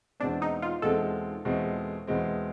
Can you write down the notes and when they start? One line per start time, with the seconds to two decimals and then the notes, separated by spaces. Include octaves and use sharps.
0.20 E2 B2 G#3 C4 D4
0.42 D#4
0.62 F4
0.82 E2 B2 G#3 C4 A4
1.45 E2 B2 G#3 C4
2.07 E2 B2 G#3 C4